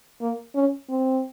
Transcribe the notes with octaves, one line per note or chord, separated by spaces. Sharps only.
A#3
C#4
C4